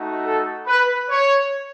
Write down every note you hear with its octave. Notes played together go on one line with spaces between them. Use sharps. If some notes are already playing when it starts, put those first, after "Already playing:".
Already playing: A3 D#4 F#4
A4
B4
C#5